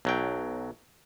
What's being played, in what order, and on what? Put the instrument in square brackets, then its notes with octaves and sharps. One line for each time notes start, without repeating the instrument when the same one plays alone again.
[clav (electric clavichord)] B1 F#3 G5